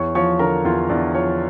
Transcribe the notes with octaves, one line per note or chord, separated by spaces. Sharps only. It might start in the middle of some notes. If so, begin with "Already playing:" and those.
Already playing: E2 C#5 C#6
F3 C#5 C#6
D3 A#4 A#5
E2 F4 F5
E2 D4 D5
F3 C#5 C#6